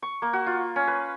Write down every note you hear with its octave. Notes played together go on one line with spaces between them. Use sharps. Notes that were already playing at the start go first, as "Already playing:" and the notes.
C#6
A#3
F#4
F4
C#4
B4